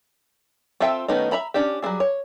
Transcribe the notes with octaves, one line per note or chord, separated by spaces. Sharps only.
C4 F4 A4 E5 G5
D#3 A3 B3 C#4 D#4
E5 A#5 B5
C#4 D4 G4
F#3 G3 C4 G#4
C#5